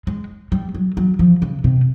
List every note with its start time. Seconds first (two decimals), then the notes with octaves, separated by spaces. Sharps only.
0.07 G#3
0.52 G3
0.75 F#3
0.97 F#3
1.19 F3
1.42 C#3
1.64 C3